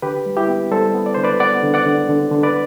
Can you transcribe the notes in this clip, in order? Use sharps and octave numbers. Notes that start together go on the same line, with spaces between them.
D3 G4 B4
G3
E4 G4
B3
G3 A4 C5
B3
D5
D3 C5
B4 D5
B3 D5 F#5
D3
D5 F#5
D3
D3
D3
B4 D5